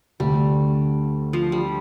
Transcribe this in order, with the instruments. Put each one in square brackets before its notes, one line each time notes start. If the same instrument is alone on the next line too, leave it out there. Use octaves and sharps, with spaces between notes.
[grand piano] D2 D3 A3 [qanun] G3
[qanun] F3
G3